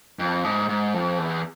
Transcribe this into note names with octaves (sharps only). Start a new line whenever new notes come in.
F2
G#2
G#2
F2
E2